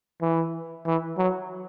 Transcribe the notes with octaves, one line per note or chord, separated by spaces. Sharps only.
E3
E3
F#3